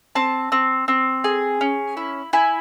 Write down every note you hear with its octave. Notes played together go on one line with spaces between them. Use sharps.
C4 A5
C4
C4
G#4
C#4
E4
E4 G#5